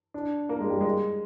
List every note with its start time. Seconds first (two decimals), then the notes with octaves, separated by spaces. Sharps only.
0.14 D4
0.49 A#3
0.60 G#3
0.70 G3
0.81 G#3